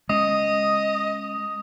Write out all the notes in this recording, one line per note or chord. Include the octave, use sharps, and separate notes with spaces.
G#3 C#4 D#5 D#6